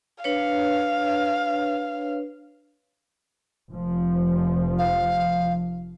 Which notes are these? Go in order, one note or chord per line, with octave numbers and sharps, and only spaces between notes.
D4 B4 C#5 F5
F1 F3
F5